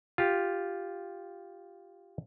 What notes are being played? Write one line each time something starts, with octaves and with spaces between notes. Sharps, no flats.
F4 G4